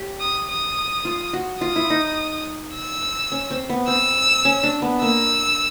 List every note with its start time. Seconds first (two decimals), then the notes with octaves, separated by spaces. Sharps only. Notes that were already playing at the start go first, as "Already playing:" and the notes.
Already playing: G4 C#5
0.20 D#6
0.48 D#6
1.05 F4
1.33 F#4
1.61 F4 D#6
1.76 E4
1.90 D#4
2.75 E6
3.32 C#4
3.51 C4
3.70 B3
3.88 C4 E6
4.45 C#4
4.64 D4
4.82 B3
5.01 A#3 E6